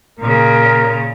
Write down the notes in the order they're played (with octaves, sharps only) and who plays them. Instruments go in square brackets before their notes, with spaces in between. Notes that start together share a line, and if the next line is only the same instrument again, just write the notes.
[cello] A#2 C#3 [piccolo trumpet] A#4